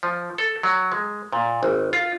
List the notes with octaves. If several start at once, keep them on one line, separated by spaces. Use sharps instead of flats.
F3
A4
F#3
G#3
A#2
G#1
F4